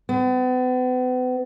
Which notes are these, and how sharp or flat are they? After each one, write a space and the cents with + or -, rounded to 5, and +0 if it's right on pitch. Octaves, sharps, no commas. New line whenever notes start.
B3 +40